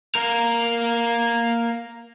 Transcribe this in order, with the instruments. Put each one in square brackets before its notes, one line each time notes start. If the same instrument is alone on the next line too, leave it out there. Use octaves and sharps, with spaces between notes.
[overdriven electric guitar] A#3 A#4